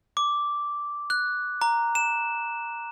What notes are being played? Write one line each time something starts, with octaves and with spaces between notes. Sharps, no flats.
D6
F#6
A#5
E7